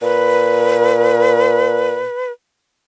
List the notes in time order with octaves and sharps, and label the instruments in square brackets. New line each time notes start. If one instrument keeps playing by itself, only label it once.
[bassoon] A#2 [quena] B4